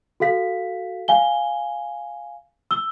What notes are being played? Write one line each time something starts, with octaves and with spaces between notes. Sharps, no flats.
F#4 A4 F5 B6
F5 G#5 G7
E6 G7